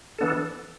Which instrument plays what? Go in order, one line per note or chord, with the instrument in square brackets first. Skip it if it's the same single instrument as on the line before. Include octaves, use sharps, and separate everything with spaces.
[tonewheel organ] E3 B3 D4 A4